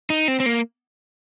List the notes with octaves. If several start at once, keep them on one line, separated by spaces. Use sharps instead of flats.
D#4
C4
C4
A#3